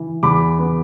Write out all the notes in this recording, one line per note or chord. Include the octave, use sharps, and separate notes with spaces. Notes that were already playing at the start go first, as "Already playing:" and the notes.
Already playing: E3
E2 B5 D6
B3